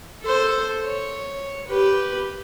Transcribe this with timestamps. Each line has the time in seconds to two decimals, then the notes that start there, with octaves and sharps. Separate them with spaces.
0.22 A4 C5
0.84 C#5
1.67 G4 B4